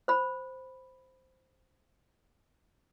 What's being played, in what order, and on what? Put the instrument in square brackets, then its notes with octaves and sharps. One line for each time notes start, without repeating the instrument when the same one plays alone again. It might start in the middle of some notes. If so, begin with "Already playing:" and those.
[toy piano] C5 B5